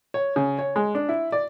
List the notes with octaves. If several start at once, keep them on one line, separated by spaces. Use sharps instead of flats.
C#5
C#3
C#5
G#3
D4
E4
D5